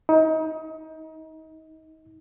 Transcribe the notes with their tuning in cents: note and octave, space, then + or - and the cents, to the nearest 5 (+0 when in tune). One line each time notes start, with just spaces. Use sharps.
D#4 +30